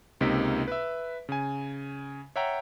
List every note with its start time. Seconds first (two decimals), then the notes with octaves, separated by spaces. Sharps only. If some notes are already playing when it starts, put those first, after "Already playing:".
0.21 C#2 C3 A#3 D#4 B6 D7
0.67 B4 E5
1.29 C#3 G#5
2.36 C#5 E5 F#5 G5 A#5